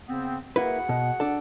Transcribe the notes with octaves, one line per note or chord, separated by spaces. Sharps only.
C#3 B3 C4
A#3 E4 F#4 G#4 B4 F#5
B2
D4 A4